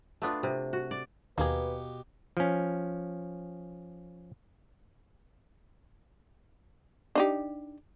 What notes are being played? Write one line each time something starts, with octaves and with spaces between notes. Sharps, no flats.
A3 B3 D4 F4
C3
F#4
D5
D#2 B2 D#3 A#3 G4 G#4 B4
F3 C#4
D4 D#4 G4